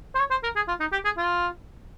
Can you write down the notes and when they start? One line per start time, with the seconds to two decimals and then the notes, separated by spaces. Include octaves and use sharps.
0.15 C5
0.19 C#5
0.31 C5
0.43 A#4
0.56 G#4
0.68 F4
0.80 D#4
0.92 G4
1.05 G#4
1.18 F4